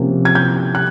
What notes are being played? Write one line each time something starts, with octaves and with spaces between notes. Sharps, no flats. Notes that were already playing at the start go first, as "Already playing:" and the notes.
Already playing: C3 F3 A#3 C#4
G#6
G6
F#6